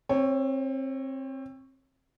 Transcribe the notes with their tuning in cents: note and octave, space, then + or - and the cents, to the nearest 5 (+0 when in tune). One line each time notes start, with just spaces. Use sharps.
C4 +25 C#5 +0